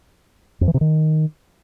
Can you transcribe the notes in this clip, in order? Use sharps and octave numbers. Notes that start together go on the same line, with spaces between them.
F2
E3
C3
D#3